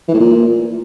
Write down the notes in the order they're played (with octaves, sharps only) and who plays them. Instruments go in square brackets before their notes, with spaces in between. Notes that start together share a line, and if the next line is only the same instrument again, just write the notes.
[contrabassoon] E3
A2
A#2